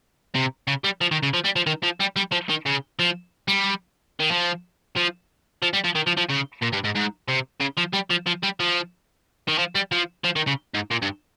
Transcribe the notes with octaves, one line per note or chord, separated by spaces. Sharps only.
C3
C#3
G3
F3
D#3
C#3
F3
G3
F3
D#3
F3
G3
G3
F3
D#3
C#3
F3
G3
D#3
F3
F3
F3
G3
F3
D#3
F3
F3
C#3
A#2
G2
G#2
G#2
C3
C#3
F3
G3
F3
F3
G3
F3
D#3
F3
G3
F3
F3
D#3
C#3
G#2
A#2
G2